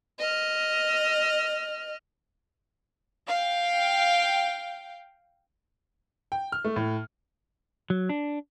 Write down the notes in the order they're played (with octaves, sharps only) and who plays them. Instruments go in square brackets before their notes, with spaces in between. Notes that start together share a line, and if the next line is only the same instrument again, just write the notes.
[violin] D#5 F6
[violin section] F5 G5
[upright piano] G5
F6
A3
A2
[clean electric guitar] F#3
D4